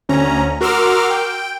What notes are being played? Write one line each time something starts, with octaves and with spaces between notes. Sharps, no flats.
D2 C#4 A#5
F#4 A#4 C6 D6 E6 F6
G5